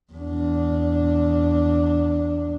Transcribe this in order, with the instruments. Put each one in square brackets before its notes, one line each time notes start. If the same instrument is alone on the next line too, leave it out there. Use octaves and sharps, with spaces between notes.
[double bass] E2 D4